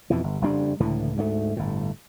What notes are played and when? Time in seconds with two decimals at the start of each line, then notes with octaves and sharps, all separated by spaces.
0.10 F2 B2 E3
0.24 G1
0.42 F#1 F2 G3 D4
0.80 C#2 A2 D3 E3
1.17 D2 G#2 G#3 A3
1.56 G1 A2